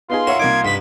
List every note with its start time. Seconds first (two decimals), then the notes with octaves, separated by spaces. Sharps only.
0.10 B3 D#4 F4 G#4 C6
0.27 F#4 A#4 C#5 E5 C#7
0.39 C2 A#3 D#4 D6 G#6
0.65 G2 B4 B6